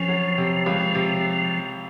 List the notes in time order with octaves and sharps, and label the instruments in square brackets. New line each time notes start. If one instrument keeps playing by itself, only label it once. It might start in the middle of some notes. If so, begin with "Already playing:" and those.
Already playing: [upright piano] F2 C#4 [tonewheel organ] F3
[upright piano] F#3
C3
C#2
C3